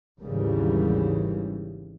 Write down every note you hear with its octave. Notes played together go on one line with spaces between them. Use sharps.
G#1 D#2 C#3 E3 G3